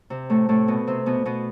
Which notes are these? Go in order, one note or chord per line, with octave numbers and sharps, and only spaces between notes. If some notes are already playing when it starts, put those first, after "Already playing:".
C3 C4
A2 A3
A2 A3
B2 B3
C3 C4
B2 B3
B2 B3